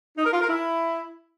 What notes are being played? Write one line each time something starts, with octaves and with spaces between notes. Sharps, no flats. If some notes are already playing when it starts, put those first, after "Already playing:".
D#4
A#4
F4
A#4
E4